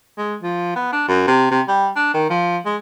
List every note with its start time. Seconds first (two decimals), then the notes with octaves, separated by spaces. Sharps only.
0.18 G#3
0.43 F3
0.76 B3
0.92 D4
1.08 F#2
1.27 C3
1.51 C3
1.68 G3
1.96 D4
2.14 D#3
2.30 F3
2.65 G#3